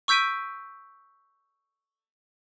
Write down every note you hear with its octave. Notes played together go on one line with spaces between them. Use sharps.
C#6 E6 G6 B6 D7 D#7